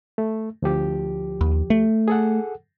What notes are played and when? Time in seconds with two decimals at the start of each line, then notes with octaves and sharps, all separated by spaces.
0.18 A3
0.62 D2 F3 G4
1.41 D#2
1.70 A3
2.08 G#4 A4 F#5